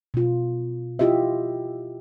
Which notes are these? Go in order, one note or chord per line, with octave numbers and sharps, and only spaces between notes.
B2 F4
E4 F4 G4 D#5 E5